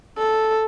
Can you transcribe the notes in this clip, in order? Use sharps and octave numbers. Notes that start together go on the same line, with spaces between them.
A4